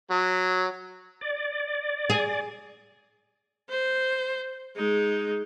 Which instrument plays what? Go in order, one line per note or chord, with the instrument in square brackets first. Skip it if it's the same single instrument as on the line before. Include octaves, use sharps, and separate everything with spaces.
[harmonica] F#3
[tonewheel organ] D5
[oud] G#4
[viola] C5
G#3 D#4